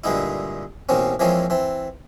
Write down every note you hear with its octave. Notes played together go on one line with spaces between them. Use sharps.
G2 A#2 D3 G#3 D#4 E4
A1 B2 A#3 C4 C#4
E3 F3 G#3 A#3 C4 C#4
E3 C4